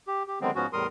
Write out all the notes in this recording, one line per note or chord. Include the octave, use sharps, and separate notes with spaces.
G4
G4
D3 D#3 F#3 G#3 B3 C4
G#2 F3 B3 C#4 F#4
E2 A2 G3 A#4 C6 D#6